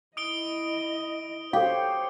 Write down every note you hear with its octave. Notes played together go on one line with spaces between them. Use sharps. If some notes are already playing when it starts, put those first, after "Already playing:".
E4 D#5 D#6 D7 G7
G4 A4 C5 C#5 F5